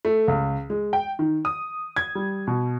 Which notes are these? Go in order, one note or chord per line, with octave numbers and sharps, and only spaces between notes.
A3
C#2
G#3
G5
D#3
D#6
G#6
G3
B2